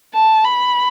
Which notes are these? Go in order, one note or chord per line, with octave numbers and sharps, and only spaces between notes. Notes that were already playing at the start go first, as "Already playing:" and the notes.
A5
B5